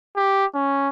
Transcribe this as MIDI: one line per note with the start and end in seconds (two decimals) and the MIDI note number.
0.17 0.45 67
0.55 0.89 61